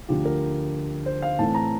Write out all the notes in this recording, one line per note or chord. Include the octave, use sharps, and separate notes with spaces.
D2 D3 F3 G4
A#4
C5
F5
A2 E3 A3 C4 A5
A#5